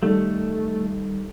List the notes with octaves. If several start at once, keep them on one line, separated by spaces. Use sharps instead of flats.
D#3 G3 A3 A4